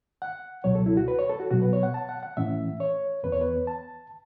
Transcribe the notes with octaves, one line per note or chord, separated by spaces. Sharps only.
F#5
C#2 B2 F#3 C#5
A4
E4
F#4
B4
C#5
A4
F#4
B2 F#3 B3 F#4
B4
C#5
F#5
A5
F#5
F#5
A2 E3 A3 C#4 E5
C#5
E2 E3 B3 B4
C#5
B4
A5